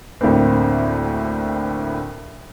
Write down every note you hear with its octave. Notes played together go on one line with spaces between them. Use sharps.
D2 A2 A#3 C4